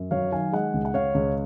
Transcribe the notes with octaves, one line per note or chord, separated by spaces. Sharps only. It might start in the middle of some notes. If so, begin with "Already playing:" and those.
Already playing: F#2
F#3 C#5 F5
D#3 F5 G#5
G#3 D#5 F#5
C#2
F#5
C#2 C#5 F5
C#2